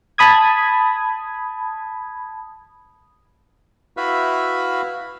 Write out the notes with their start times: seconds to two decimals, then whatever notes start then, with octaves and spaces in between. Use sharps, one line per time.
0.18 A5 B5 D#6 G#6
3.97 E4 F#4 B4 E5 F5 B5